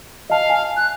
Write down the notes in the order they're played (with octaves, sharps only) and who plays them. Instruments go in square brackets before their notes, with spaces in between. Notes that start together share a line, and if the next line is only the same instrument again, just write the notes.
[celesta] D#5 A5 [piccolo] F5
[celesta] G#5
[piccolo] F#6